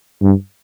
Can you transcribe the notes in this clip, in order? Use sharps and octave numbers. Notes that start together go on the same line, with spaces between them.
G2